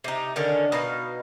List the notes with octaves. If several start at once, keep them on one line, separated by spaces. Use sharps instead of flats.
C3 D#4
D3 D#3 C#4
B2 D#4 F5